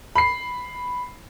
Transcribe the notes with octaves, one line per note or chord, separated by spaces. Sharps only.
B5 C7